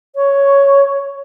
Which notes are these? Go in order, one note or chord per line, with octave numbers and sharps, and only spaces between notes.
C#5